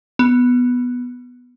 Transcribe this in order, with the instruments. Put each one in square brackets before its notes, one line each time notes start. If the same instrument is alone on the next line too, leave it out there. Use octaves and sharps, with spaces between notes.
[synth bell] B3